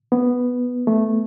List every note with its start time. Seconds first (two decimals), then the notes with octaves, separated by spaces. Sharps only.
0.12 B3
0.87 A3